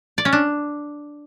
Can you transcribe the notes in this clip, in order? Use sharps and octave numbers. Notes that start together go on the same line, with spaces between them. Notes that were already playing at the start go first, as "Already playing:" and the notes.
D5
C#4
D4